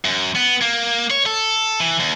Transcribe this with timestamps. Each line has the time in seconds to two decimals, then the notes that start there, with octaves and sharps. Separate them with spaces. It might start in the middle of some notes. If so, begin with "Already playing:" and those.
0.05 F#2
0.35 B3
0.62 A#3
1.10 C#5
1.26 A4
1.80 E3
2.00 D#2